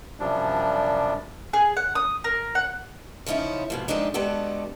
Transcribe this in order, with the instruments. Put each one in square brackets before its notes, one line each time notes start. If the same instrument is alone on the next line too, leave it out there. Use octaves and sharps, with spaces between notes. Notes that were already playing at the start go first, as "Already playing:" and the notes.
[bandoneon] F#2 C3 F3 G3 D4
[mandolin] G#4
F#5
D#6
A#4
F#5
[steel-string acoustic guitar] C#3 F3 C#4 D#4 E4
G#2 B2 F3
F3 G#3 A3 C4 D4 D#4
G#3 B3 D4 F#4 G4 A4